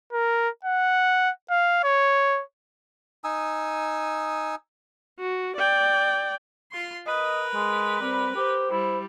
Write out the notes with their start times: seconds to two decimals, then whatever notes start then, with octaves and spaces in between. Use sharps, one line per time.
0.13 A#4
0.65 F#5
1.50 F5
1.84 C#5
3.24 D#4 G#5 D#6 E6
5.20 F#4
5.56 D5 G5
6.71 F4 C6
7.07 A#4 B4 D#5
7.55 G#3
8.00 G3 C4
8.36 G4 C5
8.71 G3 E4